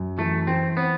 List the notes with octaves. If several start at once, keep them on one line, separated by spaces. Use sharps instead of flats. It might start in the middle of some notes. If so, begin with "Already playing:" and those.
Already playing: F#2
E3 A3
E3 C4
B3 C4